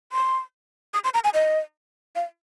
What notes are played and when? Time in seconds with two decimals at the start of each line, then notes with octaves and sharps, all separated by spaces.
0.12 C6
0.94 D#6
1.04 C6
1.14 A#5
1.24 G#5
1.34 D#5
2.16 F5